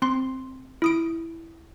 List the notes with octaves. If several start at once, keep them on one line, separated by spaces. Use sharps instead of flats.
C4 C6
E4 D#6 D7